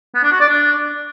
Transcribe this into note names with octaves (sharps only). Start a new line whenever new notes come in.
B3
D4
F#4
D5
D4